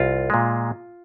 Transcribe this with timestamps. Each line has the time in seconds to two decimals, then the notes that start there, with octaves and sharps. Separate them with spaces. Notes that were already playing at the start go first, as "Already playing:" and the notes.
Already playing: C2 F4
0.30 A#2 G#3